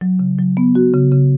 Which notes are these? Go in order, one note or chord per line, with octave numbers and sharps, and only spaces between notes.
F#3
C#3
F#3
B3
F#4
C#3
C#3